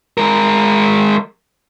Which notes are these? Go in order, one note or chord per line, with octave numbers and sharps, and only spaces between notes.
G#3 A#4